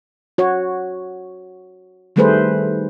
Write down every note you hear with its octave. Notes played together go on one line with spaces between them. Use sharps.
F#4 C#5
D#3 G3 A3 G#4 B4 C5